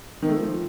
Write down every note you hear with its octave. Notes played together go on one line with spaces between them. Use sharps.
D#3
A3
F3